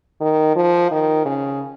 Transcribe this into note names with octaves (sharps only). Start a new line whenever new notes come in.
D#3
F3
D#3
C#3